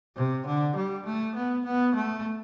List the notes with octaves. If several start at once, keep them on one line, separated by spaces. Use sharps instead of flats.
C3
D3
G3
A3
B3
B3
A3